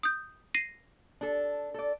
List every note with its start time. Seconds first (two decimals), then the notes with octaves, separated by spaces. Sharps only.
0.03 D#6 G6
0.54 A#6 C7 D#7
1.21 D4 A4
1.74 A4 D5